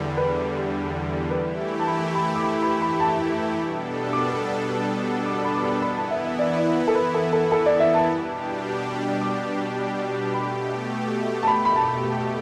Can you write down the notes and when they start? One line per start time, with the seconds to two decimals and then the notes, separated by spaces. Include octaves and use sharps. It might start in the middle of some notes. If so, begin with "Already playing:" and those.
Already playing: E2 D3 G3
0.17 B4
1.30 E3 A3 E4 G4 B4
1.79 A5
1.87 B5
2.15 B5
2.36 D6
2.44 B5
2.62 B5
2.82 B5
3.00 A5
3.56 B2 G3 B3 D4 A4
4.13 D6
5.26 D6
5.44 B5
5.55 D6
5.64 B5
5.82 E3 B3 E4 B5
5.96 A5
6.11 E5
6.25 E5
6.39 D5
6.58 D5
6.88 A4
6.95 B4
7.15 A4
7.33 A4
7.52 A4
7.66 D5
7.80 E5
7.94 A5
8.09 B2 G3 D4 G4
9.21 D6
10.34 B2 A3 G4 B5
11.43 A5
11.47 B5
11.65 B5
11.76 A5